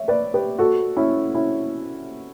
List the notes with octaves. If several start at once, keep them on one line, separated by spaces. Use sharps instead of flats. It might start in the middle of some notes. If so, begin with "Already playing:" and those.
Already playing: C#5 E5
B4 D5
G4 B4
F#4 A4
C#4 E4
C#4 E4